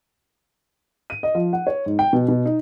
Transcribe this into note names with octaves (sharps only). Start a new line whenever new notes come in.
D#7
D#5
F3
F#5
C#5
G#2
G5
B2
B2
D#4